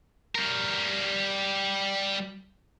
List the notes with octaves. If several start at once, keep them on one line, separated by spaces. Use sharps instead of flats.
G3 A#4